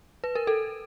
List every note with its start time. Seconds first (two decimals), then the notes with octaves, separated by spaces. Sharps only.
0.24 B4
0.35 A#4
0.47 A4